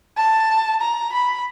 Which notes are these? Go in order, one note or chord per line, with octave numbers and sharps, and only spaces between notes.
A5
A#5
B5